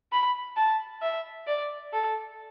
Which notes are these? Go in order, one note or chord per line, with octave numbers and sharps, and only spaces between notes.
B5
A5
E5
D5
A4